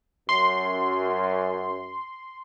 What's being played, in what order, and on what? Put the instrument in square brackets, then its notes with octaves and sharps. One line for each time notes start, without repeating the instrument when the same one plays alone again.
[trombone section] F#2 [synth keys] C6